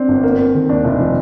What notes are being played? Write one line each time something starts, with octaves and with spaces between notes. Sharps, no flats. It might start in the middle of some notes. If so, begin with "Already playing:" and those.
Already playing: C4 D4
G1
A#3
A#3
D#3
D#2 D4
F1
F3